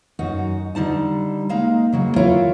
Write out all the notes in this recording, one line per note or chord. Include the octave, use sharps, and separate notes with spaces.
F#2 D#4 F#4
D3 G3 D#4 A5
G#3 A#3 D#4 F5
C#3 F#3 A#3
E4 F4 A#4 C#5 E5 F5